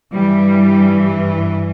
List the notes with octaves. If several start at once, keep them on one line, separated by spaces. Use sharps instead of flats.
G2 E3 G3